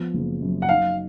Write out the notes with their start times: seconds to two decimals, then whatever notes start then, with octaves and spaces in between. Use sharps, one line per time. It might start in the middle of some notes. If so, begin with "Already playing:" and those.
Already playing: F3 B3
0.14 F#1
0.42 F#2
0.62 F#5
0.69 D#4 F5